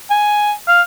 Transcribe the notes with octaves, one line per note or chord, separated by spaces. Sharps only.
G#5
F5